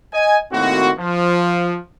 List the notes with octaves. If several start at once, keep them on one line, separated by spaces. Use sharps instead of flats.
D#5 G#5
A2 C3 D#3 A#3 C4 F#4
F3